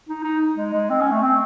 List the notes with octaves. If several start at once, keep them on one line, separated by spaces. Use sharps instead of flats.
D#4
D#4
G#3
G#3
C4
C#4
A3
C4